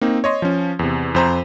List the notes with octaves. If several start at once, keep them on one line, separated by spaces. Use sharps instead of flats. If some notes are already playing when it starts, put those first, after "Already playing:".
A#3 C4 D#4
C#5 D#5 C6
F3 C#4
E2 C3
F2 C5 A#5